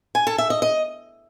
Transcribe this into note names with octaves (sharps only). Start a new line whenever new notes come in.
G#5
A4
E5
D#5
D#5